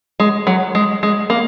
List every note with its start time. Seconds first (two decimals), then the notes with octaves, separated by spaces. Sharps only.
0.20 G#3
0.47 F#3
0.75 G#3
1.03 G#3
1.30 A#3